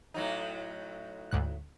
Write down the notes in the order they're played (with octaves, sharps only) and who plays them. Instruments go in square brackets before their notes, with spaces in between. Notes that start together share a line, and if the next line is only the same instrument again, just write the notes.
[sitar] A2 F#3 D#4
[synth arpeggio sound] D2 G#2 F#6